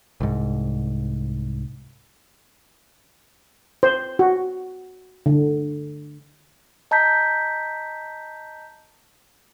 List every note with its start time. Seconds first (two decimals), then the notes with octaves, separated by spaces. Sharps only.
0.21 C2 G#2
3.83 C5
4.19 F#4
5.26 D3
6.91 D#5 A5 A#5 G6 B6